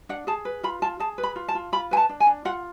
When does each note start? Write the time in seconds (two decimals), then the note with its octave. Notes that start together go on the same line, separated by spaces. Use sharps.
0.09 D4 F#5
0.27 G#4 A5
0.45 B4
0.63 F4 B5
0.82 F4 A5
1.00 G#4 A5
1.18 B4
1.23 B5
1.36 F4
1.48 A5
1.55 F4
1.72 F4 B5
1.91 B4 G#5
1.97 A5
2.09 D4
2.20 G#5
2.27 D4
2.45 F4 F#5